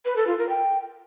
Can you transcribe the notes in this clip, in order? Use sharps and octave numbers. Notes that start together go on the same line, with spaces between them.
B4
A4
F4
A#4
G5